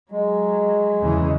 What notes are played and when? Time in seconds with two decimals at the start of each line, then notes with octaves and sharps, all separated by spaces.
0.11 F#3 G#3
1.00 E2 C#3 E3